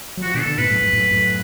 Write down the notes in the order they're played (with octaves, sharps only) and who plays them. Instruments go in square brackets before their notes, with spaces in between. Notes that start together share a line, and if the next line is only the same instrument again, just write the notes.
[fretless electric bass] F#3
[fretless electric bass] F3 [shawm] F#4
[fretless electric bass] B2 D3
[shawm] A4
[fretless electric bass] B2 D3
[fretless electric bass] G#2 B2 [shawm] B4
[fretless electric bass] F#2 A2
F2 G#2
F#2 A2
F#2 A2